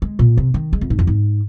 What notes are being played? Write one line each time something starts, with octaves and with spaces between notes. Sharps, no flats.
G#3
A#2
C3
D#3
G#3
F2
G#2
F2
G#2